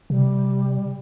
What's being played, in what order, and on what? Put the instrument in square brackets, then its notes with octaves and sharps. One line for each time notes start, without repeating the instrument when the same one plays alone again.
[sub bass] C3 [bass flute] G3